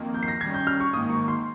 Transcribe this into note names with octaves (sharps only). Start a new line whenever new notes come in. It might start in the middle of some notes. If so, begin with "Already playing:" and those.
Already playing: F2 D#3 A#3
G6
C7
A#6
D#3 G3 C#4 G#6
G6
F6
C#6
G#2 D#3 A#3 D#6
C#6
C6